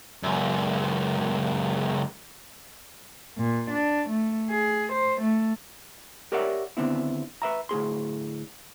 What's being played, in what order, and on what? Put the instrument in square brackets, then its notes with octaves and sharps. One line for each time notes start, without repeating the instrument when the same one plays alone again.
[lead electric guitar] C#2 F#2
[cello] A#2
D4
A3
G#4
C5
A3
[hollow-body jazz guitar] G4 A#4 C#5 D5 E5 F#5
D#2 D3 B3 C4 E4
B4 E5 A#5
D2 A2 G#4 C6